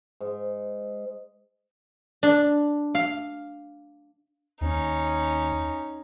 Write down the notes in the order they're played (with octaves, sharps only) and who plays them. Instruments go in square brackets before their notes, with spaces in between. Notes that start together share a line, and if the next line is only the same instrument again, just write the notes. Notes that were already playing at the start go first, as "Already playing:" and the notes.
[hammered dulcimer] G#2
[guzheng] D4
F5
[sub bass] D#2 [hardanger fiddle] C#4 D#4